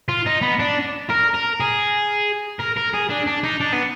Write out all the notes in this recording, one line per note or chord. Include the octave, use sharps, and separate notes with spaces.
F4
D#4
B3
D4
A#4
A#4
G#4
A#4
A#4
G#4
D4
D4
D#4
D4
B3